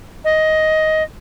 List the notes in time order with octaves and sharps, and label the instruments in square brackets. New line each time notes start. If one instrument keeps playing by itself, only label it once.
[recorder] D#5